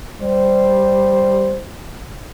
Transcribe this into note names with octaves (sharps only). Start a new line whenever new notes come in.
G3 C5